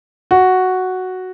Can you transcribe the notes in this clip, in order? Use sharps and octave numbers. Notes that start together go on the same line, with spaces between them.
F#4